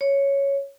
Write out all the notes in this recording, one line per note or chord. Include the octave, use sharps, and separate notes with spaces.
C#5